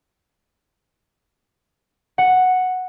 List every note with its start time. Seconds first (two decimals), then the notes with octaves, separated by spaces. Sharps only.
2.18 F#5